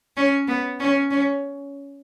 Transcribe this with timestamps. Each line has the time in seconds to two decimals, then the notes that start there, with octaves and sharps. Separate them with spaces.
0.17 C#4
0.48 B3
0.80 C#4
1.11 C#4